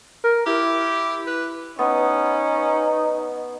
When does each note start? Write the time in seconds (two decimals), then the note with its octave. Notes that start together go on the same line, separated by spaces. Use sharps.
0.24 A#4
0.46 E4 G4
1.27 B4
1.79 B3 C#4 D#4